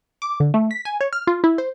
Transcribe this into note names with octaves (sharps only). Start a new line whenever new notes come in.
D6
D3
A3
B6
G#5
C#5
F6
F4
E4
C5